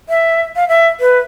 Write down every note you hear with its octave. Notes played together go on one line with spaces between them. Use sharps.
E5
F5
E5
B4